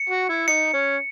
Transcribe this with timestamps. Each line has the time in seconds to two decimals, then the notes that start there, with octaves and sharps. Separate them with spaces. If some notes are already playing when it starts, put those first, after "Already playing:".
Already playing: C#7
0.10 F#4
0.29 E4
0.48 D#4 C#7
0.73 C#4